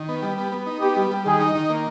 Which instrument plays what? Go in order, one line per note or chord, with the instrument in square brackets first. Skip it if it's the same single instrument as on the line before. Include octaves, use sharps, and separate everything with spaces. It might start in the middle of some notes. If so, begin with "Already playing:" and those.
Already playing: [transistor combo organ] D#3
B3
G3
B3
B3
D#4
[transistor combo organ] B3 [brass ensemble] G4
[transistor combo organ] G3
G3
[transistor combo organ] D#3 [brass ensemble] G#4
[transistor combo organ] D#4
D#3
A#3